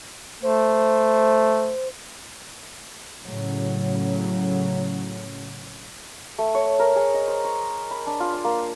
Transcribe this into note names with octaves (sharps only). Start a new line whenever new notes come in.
A3 C5
A2 C#3 F#3
A3
C#5
A#4
G#4
D#5
C5
C#6
B5
D4
F4
C6
A#3